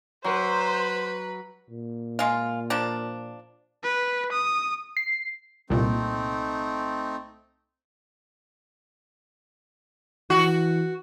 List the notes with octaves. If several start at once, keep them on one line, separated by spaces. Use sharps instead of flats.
F#3 B4 C5
A#2
G#3 F4
F3 A#3 D4
B4
D#6
C7
C2 A#2 A3 C4 D#4
E3 F#4